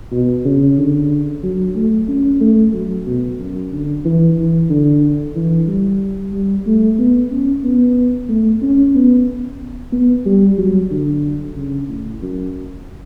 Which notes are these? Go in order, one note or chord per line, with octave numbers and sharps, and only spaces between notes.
B2
C#3
D3
F#3
A3
C#4
A3
F#3
B2
F#2
D3
E3
E3
D3
E3
G3
G3
A3
B3
C#4
B3
A3
C#4
B3
B3
G3
F#3
D3
C#3
A2
F#2